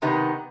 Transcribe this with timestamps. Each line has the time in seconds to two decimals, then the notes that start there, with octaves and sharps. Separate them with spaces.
0.02 C3 D#3 B3 D#4 G4